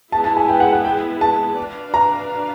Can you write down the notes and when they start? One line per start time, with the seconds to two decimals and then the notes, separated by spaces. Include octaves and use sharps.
0.12 G#3 B3 E4 G#4 A5
0.24 A5
0.37 G#5
0.48 G5
0.60 F#5
0.73 F#5
0.85 G5
1.21 A5
1.58 D4 F#4 B4 D5 F5
1.94 A#5